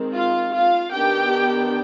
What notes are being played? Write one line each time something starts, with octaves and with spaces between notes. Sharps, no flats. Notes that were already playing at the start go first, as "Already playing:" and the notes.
Already playing: D#3 G#3 C4
F4 F5
F4 F5
D#3 B3 D4 G4 G5